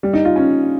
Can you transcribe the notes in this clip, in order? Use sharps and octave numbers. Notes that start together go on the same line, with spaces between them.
G3
D#4
F4
C#4